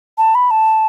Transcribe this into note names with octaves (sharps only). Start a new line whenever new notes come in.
A5
B5
A5